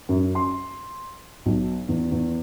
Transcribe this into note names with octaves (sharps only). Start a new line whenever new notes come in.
F#2
C6
B1
E2
E2